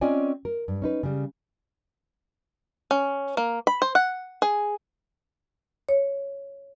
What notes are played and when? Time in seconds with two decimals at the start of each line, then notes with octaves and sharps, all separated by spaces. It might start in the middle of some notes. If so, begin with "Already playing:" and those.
0.01 C4 C#4 F4 D5 D#5 G#5
0.45 A#4
0.68 G2
0.82 C#4 D#4 B4
1.03 C#3 G3
2.91 C#4
3.37 A#3
3.67 B5
3.82 C5
3.95 F#5
4.42 G#4
5.89 C#5